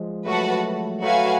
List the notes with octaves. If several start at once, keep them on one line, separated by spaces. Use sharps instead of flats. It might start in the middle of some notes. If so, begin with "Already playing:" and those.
Already playing: F3 G#3
F#3 A3 F#4 B4 F#5 A5
F#3 A3 F#4 B4 F5 G#5